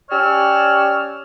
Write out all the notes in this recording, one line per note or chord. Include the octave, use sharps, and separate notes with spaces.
C#4 G4 C#5 D5 E6 F6